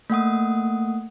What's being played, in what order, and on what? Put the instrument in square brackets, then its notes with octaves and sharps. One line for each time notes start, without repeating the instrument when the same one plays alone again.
[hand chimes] A3 A#3 F#5 D#6